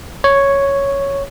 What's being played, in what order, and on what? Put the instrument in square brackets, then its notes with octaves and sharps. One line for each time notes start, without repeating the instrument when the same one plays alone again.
[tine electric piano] C#5